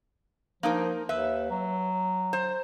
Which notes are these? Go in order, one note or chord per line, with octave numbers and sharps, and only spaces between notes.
F3 A#3 D#4 A#4
D#2 B4 E5
F#3
C5